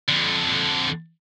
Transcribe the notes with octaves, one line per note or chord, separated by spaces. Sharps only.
F2 D3